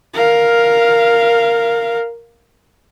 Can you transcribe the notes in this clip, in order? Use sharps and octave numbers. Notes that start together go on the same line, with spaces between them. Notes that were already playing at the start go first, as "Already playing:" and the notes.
A#4 F5